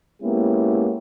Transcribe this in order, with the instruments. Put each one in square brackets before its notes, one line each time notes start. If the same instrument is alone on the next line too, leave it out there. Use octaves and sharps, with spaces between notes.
[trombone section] G#3 A#3 B3 C#4 E4 G4